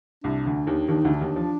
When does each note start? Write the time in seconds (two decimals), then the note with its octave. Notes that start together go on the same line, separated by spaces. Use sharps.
0.24 C2 C3 D4
0.46 D2 D3
0.66 D#2 D#3
0.88 D#2 D#3 D4
1.01 D2 D3 D#4
1.14 D4
1.21 D#2 D#3
1.36 F3